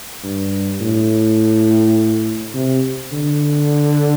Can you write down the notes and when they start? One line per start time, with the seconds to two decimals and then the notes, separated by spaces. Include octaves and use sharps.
0.24 G2
0.81 A2
2.54 C3
3.12 D3